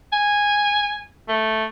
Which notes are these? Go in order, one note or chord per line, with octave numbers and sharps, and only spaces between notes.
G#5
A3